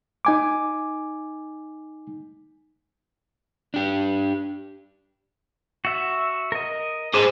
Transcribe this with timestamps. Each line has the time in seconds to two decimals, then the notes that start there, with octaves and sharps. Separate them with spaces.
0.25 D#4 G#5 D6
3.74 D4 G4
5.85 F#4 E5
6.52 A#4 D#5
7.14 E4 G#4 C5 A5 D6